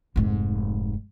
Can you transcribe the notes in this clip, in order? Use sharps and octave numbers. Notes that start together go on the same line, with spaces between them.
F1 G#2